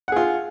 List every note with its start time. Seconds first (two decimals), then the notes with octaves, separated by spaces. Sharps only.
0.08 F#5
0.12 G#4
0.16 F4